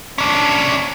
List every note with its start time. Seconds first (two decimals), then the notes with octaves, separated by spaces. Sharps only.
0.18 C#4 D4